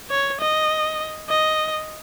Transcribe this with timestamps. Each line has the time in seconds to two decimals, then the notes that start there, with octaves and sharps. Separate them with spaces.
0.10 C#5
0.40 D#5
1.29 D#5